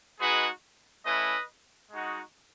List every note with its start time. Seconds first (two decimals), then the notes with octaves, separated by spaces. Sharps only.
0.19 G#3 D#4 F#4 G#4 B4
1.04 A3 C#4 E4 B4 D#5
1.90 G#3 D#4 F#4